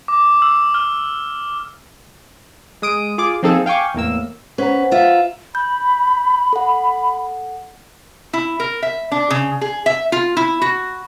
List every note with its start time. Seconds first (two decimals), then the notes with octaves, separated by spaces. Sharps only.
0.08 D6
0.42 E6
0.74 F6
2.82 G#3 D#6 D7
3.18 F4 G#4 D6
3.43 F3 A#3 C4 D#4 G#4 A4
3.66 F5 G5 G#5 C#6 D6
3.94 E2 A2 A#3 E6
4.58 C#4 B4 C5 F#5 A#5
4.91 F4 E5
5.55 B5 G6
6.53 A4 F#5
8.33 E4
8.60 A#4
8.82 E5
9.12 D4
9.30 C#3
9.61 G#4
9.86 E5
10.12 F4
10.37 E4
10.62 F#4